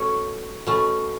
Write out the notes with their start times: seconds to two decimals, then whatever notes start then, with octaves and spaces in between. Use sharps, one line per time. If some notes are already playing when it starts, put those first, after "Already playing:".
Already playing: B2 A3 C#4 C#5
0.67 B2 A3 C#4